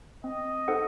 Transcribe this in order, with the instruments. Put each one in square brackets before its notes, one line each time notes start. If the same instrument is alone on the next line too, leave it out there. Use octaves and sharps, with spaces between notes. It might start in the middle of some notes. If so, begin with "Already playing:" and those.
[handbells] C4 [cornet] D#5
[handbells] D#4 A4 C5 F#5